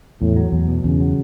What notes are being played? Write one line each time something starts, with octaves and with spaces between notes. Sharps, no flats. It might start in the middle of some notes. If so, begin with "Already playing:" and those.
E2 A2
F#3
E2
B2
E2 C#3
F#3